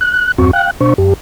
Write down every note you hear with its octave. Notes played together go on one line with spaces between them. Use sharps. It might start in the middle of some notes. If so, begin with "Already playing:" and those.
F#6
E2 G2 C4 F#4 C#6
F5 G5 F#6
B2 D4 C5 C#6
F#2 G4